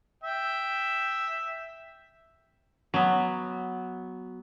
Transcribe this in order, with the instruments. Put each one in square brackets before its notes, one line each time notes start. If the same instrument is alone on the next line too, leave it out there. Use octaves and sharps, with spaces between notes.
[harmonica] E5 G5
[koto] F#3 B3